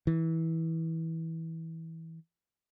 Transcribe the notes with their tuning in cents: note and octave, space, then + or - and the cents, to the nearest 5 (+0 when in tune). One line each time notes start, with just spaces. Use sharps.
E3 -20